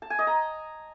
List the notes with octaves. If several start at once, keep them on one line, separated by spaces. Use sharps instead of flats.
A5
G#5
D#5
A#5